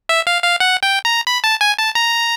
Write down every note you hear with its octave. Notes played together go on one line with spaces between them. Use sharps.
E5
F5
F5
F#5
G5
A#5
B5
A5
G#5
A5
A#5